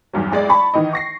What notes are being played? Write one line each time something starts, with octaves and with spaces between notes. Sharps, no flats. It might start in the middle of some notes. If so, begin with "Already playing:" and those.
B1 E2 G2 F#3
A1 G#3 D5
A5 B5 C#6
D#3 E3 D#4 D#5
C#6 A#6 C7